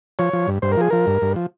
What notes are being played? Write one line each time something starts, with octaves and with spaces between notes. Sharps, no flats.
F3 C#5
F3
G2
G2 C5
A#4
F3 G#4
F3 A#4
G2
G2
F3